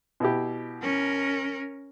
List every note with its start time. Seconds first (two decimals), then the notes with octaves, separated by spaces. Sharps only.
0.20 B2 E4 G4
0.82 C#4 A#4